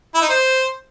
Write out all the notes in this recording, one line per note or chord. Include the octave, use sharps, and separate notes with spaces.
E4
D#4
C5